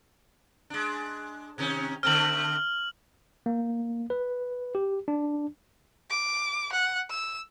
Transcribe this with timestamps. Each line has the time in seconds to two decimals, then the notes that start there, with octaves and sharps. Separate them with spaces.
0.70 G#3 D4
1.58 C3 D#3 C#4
2.03 D3 A3 C4 F6 F#7
3.46 A#3
4.10 B4
4.75 G4
5.08 D4
6.10 D6
6.72 F#5
7.10 E6